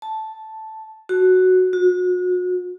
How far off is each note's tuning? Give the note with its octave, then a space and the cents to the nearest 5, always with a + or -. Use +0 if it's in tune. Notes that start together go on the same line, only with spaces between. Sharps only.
A5 -5
F#4 +0
F#4 -35